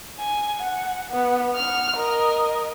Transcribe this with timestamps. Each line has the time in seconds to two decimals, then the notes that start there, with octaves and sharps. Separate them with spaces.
0.19 G#5
0.60 F#5
1.11 B3
1.56 F#5 F6
1.97 A#4 D#5